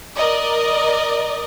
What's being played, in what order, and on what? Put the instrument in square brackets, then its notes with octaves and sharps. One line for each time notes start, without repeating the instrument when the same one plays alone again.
[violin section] A#4 D5 D#5